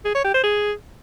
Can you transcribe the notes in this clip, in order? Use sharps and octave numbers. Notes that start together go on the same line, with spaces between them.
G#4
C#5
G4
C5
G#4